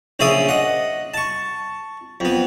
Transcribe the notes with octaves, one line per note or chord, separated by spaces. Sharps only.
A#1 C#3 C5 D5 E5 D#6
D#5 F#5
A5 C#6
F2 B3